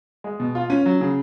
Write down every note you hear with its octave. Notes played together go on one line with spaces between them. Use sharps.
G#3
B2
F4
C#4
F#3
C#3